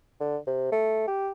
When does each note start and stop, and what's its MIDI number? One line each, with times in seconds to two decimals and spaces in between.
0.20 0.37 50
0.47 0.68 48
0.72 1.03 57
1.08 1.31 67